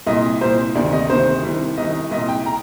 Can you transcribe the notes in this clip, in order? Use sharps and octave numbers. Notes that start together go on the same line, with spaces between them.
C2 A#2 D#5
C2 A#2 C5
D2 C3 D#3 D5
D#5
D2 C3 D#3 C5
C2 C3 D#3
C2 C3 D#3 D#5
C2 A#2 D#5
G5
A#5